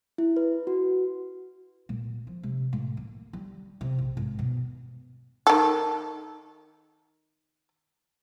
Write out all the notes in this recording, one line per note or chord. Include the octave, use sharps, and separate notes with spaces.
E4
B4
F#4
A#2
F3
C3
A2
A#3
G3
C3
A#1
G#1
B2
D#3 A4